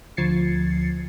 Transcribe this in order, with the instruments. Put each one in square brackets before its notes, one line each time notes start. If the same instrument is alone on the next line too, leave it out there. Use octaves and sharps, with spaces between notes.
[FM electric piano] D2 F3 G#6 A6 C7 C#7